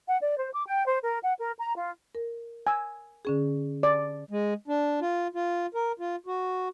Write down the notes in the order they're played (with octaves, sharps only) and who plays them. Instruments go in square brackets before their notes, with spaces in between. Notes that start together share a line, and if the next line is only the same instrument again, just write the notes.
[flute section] F#5
D5
C5
D6
G5
C5
A#4
F#5
A#4
A#5
F4
[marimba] A#4
[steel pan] G#5 E6
[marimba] D3 C#4 G#4
[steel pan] D5
[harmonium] G#3
D4
F4
F4
A#4
F4
F#4